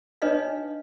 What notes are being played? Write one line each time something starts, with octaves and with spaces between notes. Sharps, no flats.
D4 D#4 B4 C#5 D#5 F5